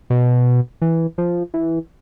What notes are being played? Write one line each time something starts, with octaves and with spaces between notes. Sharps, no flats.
B2
E3
F3
E3